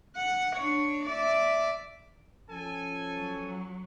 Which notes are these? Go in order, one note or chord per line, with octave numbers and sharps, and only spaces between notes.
F#5
D4 C#5
D5 E5
F3 C#4 A4 G#5
F#3